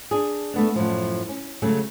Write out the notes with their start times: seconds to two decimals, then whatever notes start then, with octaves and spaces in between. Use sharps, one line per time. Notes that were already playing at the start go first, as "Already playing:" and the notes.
0.11 D4 G#4
0.54 A3 B3 D4
0.76 F#2 A2 F3
1.29 C#4
1.62 C#3 F#3 G#3 A3 C#4